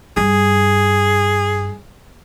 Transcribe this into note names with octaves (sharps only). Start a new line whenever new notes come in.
G2 G#4